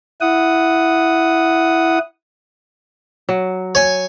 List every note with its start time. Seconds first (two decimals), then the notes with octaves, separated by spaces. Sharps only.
0.21 E4 F#5 D#6
3.29 F#3
3.75 C#5 G#5